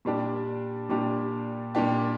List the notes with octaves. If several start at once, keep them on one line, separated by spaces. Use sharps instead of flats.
A#2 G3 D4 G4
A#2 G3 D4 G4
A#2 G3 D4 G4